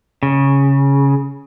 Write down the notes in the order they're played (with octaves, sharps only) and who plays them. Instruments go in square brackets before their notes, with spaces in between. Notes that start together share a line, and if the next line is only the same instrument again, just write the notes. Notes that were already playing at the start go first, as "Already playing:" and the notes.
[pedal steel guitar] C#3